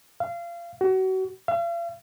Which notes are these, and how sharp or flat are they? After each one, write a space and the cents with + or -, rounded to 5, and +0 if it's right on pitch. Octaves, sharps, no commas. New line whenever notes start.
F5 -25
F#4 +30
F5 -40